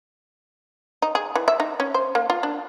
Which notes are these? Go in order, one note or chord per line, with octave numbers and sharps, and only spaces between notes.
D#4
G#4
E3
E5
D#4
C#4
C5
A#3
F4
D4